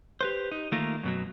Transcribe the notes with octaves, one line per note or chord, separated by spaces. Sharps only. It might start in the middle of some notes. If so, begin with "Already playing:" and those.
G4 B4 C5
D#4
D#3 A3 A#3 F4 A#4
F#2 B2 F#3